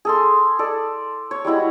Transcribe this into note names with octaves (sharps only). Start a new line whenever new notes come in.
G#4 A4 C6
A4 D5
C#5
G3 G#3 E4 F#4